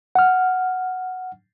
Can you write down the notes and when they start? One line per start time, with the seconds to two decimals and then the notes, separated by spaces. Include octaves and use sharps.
0.15 F#5 F6